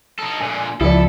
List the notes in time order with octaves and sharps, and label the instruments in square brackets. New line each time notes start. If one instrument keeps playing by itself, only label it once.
[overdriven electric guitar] D#4 A4
[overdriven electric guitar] A#2 D3 [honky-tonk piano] G#5
[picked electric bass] C#2 F3 [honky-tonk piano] E4 D5 [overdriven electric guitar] A4